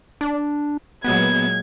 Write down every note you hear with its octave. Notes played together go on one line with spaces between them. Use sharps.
D4
A#2 F#3 G#3 B3 G#6